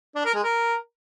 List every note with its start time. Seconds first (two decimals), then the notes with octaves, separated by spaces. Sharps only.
0.15 D4
0.25 A#4
0.34 G#3
0.43 A#4